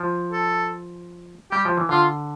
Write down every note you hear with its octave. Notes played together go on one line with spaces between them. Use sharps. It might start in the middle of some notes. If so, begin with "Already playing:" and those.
Already playing: F3
A4
G3 G4
F3
E3
D3 F4